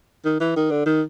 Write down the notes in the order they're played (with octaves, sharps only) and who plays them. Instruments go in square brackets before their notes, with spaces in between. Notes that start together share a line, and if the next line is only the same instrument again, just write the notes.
[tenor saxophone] D#3
E3
D#3
D3
D#3